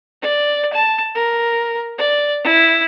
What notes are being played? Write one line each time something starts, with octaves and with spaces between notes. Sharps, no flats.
D5
A5
A#4
D5
E4